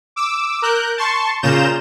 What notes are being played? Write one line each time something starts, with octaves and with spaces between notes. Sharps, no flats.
D6 E6
A#4 F#6 G6
A5 C6 C#6
A#2 C#3 F4 A#5 G6 E7